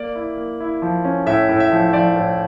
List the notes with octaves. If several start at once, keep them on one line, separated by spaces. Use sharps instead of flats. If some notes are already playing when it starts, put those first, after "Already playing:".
Already playing: A#3 D5
E4
A#3
E4
F3
C#4
A2 E5
A2
E5
F3
F3 D5
A2